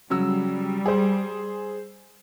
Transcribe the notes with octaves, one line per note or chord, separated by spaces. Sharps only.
C#3 F#3 G3 E6
G#4 C5